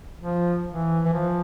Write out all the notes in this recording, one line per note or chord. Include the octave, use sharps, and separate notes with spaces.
F3
E3
E3
F3